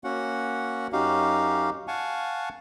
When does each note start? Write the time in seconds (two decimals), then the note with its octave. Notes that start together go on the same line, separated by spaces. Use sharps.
0.04 A#3 C#4 F#4 F#5
0.93 F#2 C#4 D#4 F#4 G4 F5
1.88 F5 F#5 G#5 A5 C#6